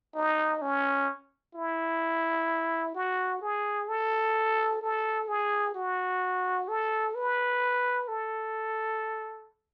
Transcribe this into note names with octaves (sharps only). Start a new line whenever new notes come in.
D#4
C#4
E4
F#4
G#4
A4
A4
G#4
F#4
A4
B4
A4